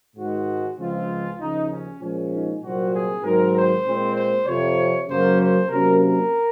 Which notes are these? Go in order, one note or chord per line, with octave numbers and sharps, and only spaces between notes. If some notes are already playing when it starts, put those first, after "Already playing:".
G#2 D#3 G#3 F#4
C#2 C#3 F3 G#3 C4 F4
D#2 C#3 F3 D#4
C#4
A#2 F3 G#3 C#4
D#4
C2 A#2 F#3 C4 F#4
G#4
G#2 D#3 F#3 C4 A#4
C5
A#2 G#3 C4
C5
F2 C3 F3 C#5
F#2 C#3 F#3 A#3 C#4 C5
C5
C3 F#3 A#3 C#4 A#4
A#4